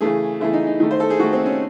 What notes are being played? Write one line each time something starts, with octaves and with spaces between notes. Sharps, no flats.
C#3 E3 A3 G#4
C#3 E3 A3 E4
D#4
D#4
D#3 A3
C5
A4
G#4
D#3 A3 F#4
C4
C#4